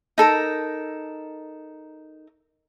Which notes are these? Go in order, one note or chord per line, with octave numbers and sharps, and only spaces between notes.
D#4 A4 A#4